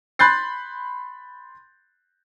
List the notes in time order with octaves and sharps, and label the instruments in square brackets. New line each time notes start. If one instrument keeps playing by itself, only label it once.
[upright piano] B5 C6 F#6 G6 A6 C7